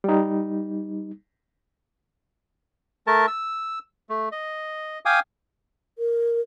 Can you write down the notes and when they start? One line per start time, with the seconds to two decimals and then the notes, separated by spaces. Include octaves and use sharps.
0.04 G3 D#4
3.07 A3 A#4 A5
3.27 E6
4.09 A3
4.32 D#5
5.05 F5 G5 G#5 D6 D#6
5.98 A#4